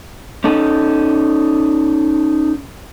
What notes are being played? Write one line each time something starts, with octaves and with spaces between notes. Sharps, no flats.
C#4 D#4 A4